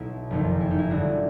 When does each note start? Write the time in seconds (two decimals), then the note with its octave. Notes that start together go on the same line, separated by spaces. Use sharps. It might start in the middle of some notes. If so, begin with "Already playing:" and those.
Already playing: B1 B2 E4
0.31 F#1 F2 C3 D#3 D#4
0.61 E4
0.71 D#4
0.78 E4
0.90 G1 G2 D3 F#4